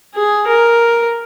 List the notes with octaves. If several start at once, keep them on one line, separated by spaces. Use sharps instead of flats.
G#4
A#4